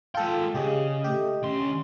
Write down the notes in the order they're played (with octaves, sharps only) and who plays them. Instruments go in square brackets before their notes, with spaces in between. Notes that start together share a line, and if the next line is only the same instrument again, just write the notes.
[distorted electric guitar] G#3 G5 [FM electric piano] F4 A4
[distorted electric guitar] C#3 [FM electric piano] G4 G#4 [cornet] D#5
[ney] A3 [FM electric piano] G4
[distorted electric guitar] D2 C6 [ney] C#4